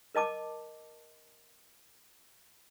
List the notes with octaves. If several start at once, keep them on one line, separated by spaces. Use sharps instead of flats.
A#4 D#5 A5 D6